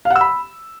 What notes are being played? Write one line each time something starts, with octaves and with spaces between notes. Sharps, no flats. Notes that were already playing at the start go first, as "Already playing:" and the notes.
F5
F#5
E6
B5